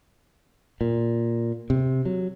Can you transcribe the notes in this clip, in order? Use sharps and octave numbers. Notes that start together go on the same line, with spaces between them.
A#2
C3
F#3